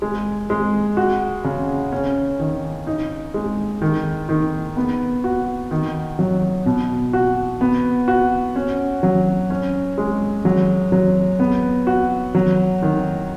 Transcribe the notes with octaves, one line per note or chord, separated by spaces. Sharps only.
G#3
G#3
F#4
C#3
C#4
D#3
D#4
G#3
D#3
D#3
B3
F#4
D#3
F#3
B2
F#4
B3
F#4
C#4
F#3
C#4
G#3
F#3
F#3
B3
F#4
F#3
D#3